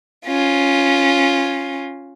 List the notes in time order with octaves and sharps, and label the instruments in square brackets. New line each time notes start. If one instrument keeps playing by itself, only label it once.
[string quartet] C#4 F4